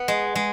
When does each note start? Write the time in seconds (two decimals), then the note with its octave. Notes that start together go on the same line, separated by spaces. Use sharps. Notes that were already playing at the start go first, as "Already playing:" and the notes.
Already playing: B3
0.08 G#3
0.35 G#3